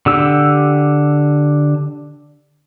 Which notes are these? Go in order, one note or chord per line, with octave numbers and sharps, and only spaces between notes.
D3 G4 E6